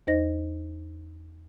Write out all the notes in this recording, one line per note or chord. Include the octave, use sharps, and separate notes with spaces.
E2 D#4 C5 D#5 A#6